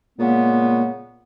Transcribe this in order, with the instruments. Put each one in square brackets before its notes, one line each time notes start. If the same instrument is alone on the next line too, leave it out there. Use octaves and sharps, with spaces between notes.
[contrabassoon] A#2 [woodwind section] C#3 G#3 B3